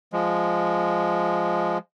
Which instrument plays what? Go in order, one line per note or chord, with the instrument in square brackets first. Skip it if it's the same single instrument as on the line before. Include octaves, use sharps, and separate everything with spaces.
[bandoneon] F3 G#3